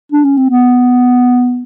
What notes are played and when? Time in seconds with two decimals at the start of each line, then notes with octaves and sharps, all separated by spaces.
0.12 D4
0.24 C#4
0.37 C4
0.50 B3